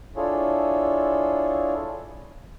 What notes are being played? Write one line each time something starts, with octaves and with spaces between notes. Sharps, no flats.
D4 E4 F4 G#4 A4 C#5